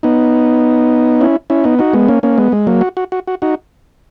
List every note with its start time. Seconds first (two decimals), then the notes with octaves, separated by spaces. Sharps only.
0.03 B3 D#4
1.21 C#4 E4
1.50 C#4 E4
1.64 B3 D#4
1.79 D#4 F#4
1.93 G#3 B3
2.08 A#3 C#4
2.23 A#3 C#4
2.38 G#3 B3
2.52 G#3
2.67 F#3 A#3
2.81 F#4
2.97 F#4
3.12 F#4
3.27 F#4
3.42 D#4 F#4